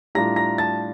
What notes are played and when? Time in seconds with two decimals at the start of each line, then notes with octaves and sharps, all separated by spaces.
0.15 A2 G3 D4 F4 A#5 A#6
0.36 A#5 A#6
0.58 A5 A6